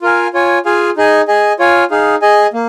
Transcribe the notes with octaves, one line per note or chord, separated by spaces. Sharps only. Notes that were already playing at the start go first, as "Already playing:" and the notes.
F4 A#4 F5 G#5
F4 C#5 G#5
F4 G#4 F5 G#5
D#4 G#4 D#5 G#5
G#4 D#5 G#5
F4 C#5 F5 G#5
D#4 G#4 F5
G#4 D#5 G#5
A#3